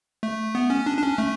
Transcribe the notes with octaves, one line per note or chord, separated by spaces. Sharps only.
A3
B3
C#4
D4
D4
C#4
A3